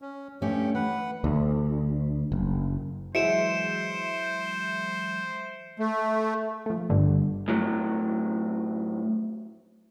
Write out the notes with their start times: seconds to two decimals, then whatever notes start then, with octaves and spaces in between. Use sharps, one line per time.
0.02 C#4
0.42 G2 A3 C#4 G4
0.75 E3 B4 F#5
1.24 D2
2.32 F#1
3.15 E3 F#3 G#3 C5 E5 C#7 D7 E7
5.78 A3
6.66 F3 A3
6.90 G1 G2 D3
7.48 F#2 A2 F#3